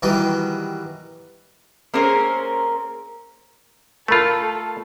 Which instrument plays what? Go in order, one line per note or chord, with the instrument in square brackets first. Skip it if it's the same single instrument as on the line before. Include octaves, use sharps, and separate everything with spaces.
[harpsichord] D#3 E3 F#3 G3
[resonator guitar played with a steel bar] A#3 C4 C#4 G#4 A#4 C5
[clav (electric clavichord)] A3 F4 [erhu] A4 [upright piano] A#4 B5